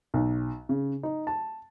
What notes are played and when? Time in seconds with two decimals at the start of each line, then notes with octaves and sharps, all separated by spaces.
0.14 B1
0.69 C#3
1.03 D#4
1.27 A5